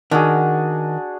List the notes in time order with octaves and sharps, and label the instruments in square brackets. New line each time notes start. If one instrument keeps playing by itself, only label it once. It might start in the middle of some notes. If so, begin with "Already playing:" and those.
[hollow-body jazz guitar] D#3 [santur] D4 F#4 G#4